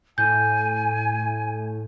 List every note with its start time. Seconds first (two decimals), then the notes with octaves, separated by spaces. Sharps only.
0.18 A2 G#5 G6